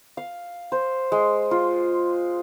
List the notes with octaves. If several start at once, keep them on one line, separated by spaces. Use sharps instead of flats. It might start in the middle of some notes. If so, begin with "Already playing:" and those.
F5
C5
G#3
F4